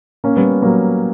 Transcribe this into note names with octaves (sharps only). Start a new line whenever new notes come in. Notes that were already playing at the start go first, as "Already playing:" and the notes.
A#3 C#4
G3 B3
F#3 A#3